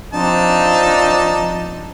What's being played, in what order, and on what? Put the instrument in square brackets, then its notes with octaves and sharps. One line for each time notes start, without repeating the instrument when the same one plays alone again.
[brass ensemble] F3 C4 D4 [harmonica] D#4 A5